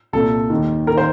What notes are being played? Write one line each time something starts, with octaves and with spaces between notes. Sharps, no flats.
C2 A#2 A4
D#2 D#3
A#4
D#3
C5